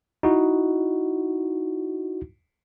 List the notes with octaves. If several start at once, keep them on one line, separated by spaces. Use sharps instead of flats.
D#4 E4 F#4